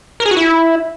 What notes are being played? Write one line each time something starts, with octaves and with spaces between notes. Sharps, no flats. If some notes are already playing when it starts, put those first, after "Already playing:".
A#4
G#4
F#4
E4